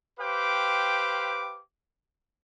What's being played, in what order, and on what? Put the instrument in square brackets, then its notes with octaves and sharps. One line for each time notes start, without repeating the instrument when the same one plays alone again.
[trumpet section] G4 B4 C5 F5 G5 D6